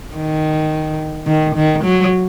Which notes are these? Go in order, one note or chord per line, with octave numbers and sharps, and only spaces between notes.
D#3
D#3
D#3
F#3